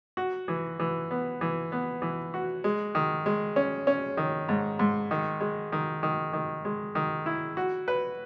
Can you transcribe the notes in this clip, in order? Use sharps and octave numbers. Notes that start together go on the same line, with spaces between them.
F#4
E3
E3
B3
E3
B3
E3
F#4
G#3
D#3
G#3
C#4
C#4
D#3
G#2
G#2
D#3
G#3
D#3
D#3
D#3
G#3
D#3
E4
F#4
B4